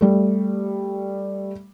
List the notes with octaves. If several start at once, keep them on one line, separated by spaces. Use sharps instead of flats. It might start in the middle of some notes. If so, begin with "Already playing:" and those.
G3 A3